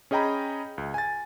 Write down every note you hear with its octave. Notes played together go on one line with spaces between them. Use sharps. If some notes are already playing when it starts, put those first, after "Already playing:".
C#4 G#4 D#5 G5 A#5 B5
C#2
G#5 A6